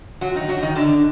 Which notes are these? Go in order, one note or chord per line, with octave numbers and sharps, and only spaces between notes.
F#3 F#4
D#3 D#4
F#3 F#4
D#3 D#4
D3 D4